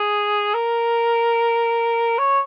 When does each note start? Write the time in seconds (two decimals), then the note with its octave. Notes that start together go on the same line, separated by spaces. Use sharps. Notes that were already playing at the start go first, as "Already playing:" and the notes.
Already playing: G#4
0.54 A#4
2.18 C#5